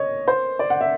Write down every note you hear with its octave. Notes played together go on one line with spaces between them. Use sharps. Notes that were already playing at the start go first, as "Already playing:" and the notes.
Already playing: C#5 D#5
C5
D5
F#5
E5